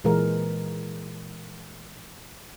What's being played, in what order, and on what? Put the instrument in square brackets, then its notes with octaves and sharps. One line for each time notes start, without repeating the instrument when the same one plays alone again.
[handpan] A#2 E3 G#3 A#4